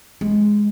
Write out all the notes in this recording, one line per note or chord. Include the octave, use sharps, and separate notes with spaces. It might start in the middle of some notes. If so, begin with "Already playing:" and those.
G#3